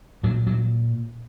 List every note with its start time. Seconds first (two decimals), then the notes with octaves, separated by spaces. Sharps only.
0.23 A#2 F#3
0.47 F#3